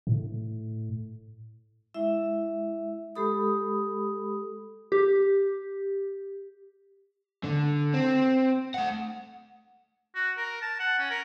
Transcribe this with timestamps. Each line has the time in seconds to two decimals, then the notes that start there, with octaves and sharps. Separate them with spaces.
0.07 A2
1.94 G#3 E4 E5
3.15 G#3 G4 A4 B5 D#6
4.92 G4
7.44 D3
7.94 C4
8.74 A3 F#5
10.15 F#4
10.37 A#4
10.62 A5
10.79 F#5
10.99 C#4
11.10 A#4